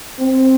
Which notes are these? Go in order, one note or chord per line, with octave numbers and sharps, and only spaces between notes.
C4